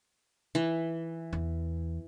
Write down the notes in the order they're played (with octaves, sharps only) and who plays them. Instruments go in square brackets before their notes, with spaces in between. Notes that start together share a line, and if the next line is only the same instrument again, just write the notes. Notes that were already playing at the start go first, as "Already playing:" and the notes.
[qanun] E3
[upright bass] E2